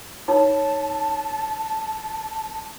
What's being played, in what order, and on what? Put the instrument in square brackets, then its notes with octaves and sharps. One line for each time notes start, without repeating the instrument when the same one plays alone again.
[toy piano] D#4 C#5 B5 [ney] A5